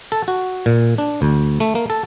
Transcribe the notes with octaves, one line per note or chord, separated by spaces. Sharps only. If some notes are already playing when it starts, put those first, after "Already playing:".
A4
F#4
A#2
D4
D2
A3
A#3
A4